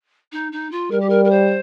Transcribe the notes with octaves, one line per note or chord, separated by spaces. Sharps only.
D#4
D#4
F4
G3 A#4
G4
A#4
A#4
C5